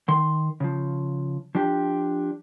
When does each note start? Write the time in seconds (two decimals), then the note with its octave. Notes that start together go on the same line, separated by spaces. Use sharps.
0.08 D#3 C6
0.60 C#3 F3
1.55 F3 D4 G4